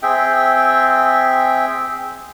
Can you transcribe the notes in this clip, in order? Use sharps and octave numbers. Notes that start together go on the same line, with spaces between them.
C4 G#4 E5 G5